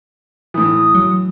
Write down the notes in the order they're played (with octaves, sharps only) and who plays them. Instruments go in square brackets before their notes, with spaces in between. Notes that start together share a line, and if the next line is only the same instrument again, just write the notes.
[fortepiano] A2 E3 [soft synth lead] D#6
[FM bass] F#3